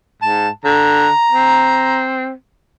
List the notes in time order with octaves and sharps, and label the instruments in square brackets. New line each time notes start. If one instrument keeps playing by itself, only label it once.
[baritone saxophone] G#2 [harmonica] A5
[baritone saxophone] D3 [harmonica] A#5
[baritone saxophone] C4